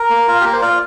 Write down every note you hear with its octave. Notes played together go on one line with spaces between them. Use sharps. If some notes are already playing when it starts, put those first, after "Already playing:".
Already playing: A#4
A#3
F4
G4
A#3 A#4
C5
F4 D5